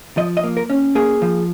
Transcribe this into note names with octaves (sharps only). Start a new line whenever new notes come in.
F3 D#5
D#5
A#3
A#4
C#4
A#3 G#4
F3